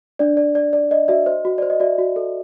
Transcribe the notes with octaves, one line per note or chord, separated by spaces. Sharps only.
D4 D5
D5
D5
D5
D5 D#5
F#4 D5 E5
C5 D#5
F#4
C5 D5
D#5
F#4 D5 E5
F#4
A4